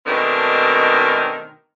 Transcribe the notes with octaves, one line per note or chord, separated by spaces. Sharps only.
G#2 B2 D#3 A3 C4 D4